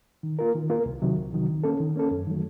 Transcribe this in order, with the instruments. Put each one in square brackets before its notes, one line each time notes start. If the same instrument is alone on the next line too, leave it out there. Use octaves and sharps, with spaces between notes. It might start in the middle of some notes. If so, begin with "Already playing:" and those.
[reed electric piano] D#3
A#3 F4 A#4
D#3
A#3 F4 A#4
C2
C3 D#3 F#3
C2
C3 D#3 F#3
D#3
A#3 C#4 A4
D#3
A#3 C#4 A4
F#2
D#3 F#3 A3